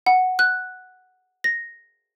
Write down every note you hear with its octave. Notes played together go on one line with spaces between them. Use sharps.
F#5
F#6
A#6